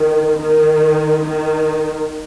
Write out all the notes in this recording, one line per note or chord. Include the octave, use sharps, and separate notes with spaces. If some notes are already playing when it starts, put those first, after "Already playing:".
Already playing: D#3
D#3
D#3